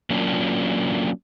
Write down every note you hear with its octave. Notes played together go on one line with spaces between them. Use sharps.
F#3 A#3 C#4 D4 F4